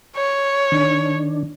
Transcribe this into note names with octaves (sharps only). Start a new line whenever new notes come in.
C#5
D#3 D4